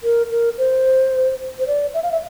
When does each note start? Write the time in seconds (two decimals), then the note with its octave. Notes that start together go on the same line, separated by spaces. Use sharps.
0.04 A#4
0.30 A#4
0.58 C5
1.59 C5
1.67 D5
1.94 E5
2.03 F5
2.12 E5